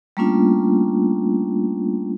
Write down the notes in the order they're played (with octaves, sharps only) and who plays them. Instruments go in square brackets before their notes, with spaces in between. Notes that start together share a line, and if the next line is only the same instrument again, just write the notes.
[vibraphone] G3 A3 A#3 C#4 D4 F4